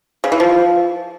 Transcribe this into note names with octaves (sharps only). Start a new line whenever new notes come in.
C#3
E3
F3